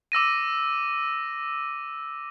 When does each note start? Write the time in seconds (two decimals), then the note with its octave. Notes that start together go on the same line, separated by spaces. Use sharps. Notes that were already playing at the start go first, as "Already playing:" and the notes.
0.12 D6 E6 A#6 D#7